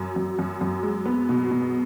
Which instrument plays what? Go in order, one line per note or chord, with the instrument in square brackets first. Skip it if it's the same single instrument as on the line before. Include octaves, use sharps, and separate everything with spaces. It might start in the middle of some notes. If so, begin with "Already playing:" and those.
Already playing: [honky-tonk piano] F#2
F#2
F#2
F#2
G#3
B3
B2
B2